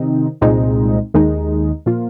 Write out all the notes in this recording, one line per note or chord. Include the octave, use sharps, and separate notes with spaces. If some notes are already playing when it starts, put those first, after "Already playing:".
Already playing: C3 D#3 C4 D#4
C2 A#2 G#3 C4 D#4
D#2 D#3 G#3 D#4
A#2 F3 A#3 F4